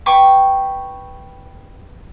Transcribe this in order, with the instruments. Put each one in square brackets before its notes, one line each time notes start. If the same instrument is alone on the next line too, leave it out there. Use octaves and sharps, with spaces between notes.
[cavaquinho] B4 G5 C#6 D6